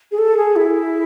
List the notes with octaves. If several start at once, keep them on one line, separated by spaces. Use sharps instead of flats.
G#4
A4
G#4
E4